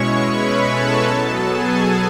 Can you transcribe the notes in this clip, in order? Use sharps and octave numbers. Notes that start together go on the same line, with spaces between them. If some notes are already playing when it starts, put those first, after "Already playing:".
Already playing: B2 G#3 C#4 E4 C#5 C#6
B4 B5
A4 A5
B2 F#3 B3
G#4 G#5